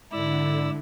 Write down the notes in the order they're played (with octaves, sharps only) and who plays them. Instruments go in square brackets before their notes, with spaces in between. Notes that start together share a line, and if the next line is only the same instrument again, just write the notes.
[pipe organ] G#2 D5 E6 [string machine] D3 [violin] E4